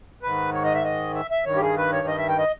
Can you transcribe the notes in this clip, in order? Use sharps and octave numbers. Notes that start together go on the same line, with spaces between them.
G#2 D#3 B4
C#5
D#5
E5
D#5
E5
E5
G2 D#3 C#5
G4
G#4
B4
C#5
D#5
E5
G5
D#5